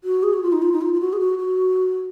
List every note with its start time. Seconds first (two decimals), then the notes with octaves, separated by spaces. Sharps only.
0.04 F#4
0.23 G#4
0.33 F#4
0.43 F4
0.52 D#4
0.62 F4
0.72 D#4
0.81 F4
0.93 F4
1.01 F#4
1.13 G#4
1.20 F#4
1.38 F#4